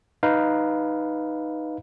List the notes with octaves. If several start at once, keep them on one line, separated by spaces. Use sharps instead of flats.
D#4 B4 F5